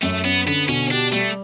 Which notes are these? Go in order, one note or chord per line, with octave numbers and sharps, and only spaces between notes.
F#2 A3
B3 C#4
D3 B3
B2 C#4
D4 G4
G3 A3